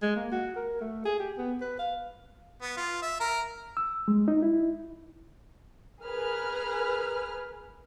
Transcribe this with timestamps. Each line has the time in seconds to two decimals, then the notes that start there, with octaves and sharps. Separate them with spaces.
0.02 G#3
0.16 A#3
0.32 F#4
0.56 A#4
0.81 A3
1.05 G#4
1.20 G4
1.38 B3
1.61 B4
1.79 F5
2.62 B3
2.77 F4
3.02 E5
3.20 A#4
3.77 E6
4.08 G#3
4.28 D#4
4.42 E4
6.03 G#4 A#4 B4 F6